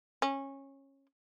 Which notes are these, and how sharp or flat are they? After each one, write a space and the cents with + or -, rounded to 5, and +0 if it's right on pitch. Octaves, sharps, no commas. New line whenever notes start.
C#4 -20